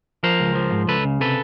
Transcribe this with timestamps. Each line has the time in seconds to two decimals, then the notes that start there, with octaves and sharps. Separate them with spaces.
0.23 F3 A#4 C5
0.40 C#2
0.55 F3
0.72 G#2
0.88 C#2 A4 B4
1.05 C#3
1.21 C3 A4 B4